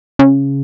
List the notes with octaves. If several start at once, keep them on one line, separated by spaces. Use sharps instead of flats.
C#3